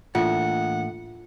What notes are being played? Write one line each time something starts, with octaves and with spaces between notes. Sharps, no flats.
A2 E3 A#3 D4 F4 F#5